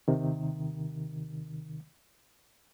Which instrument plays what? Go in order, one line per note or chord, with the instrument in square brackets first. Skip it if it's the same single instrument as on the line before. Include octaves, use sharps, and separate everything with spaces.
[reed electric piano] D#2 C3 D#3